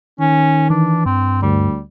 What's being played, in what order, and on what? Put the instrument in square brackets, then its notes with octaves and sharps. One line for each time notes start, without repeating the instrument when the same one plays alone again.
[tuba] D#3 [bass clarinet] C#4
[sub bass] E3 [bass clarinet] D4
[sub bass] G2 [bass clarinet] C4
[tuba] D2 [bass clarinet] G3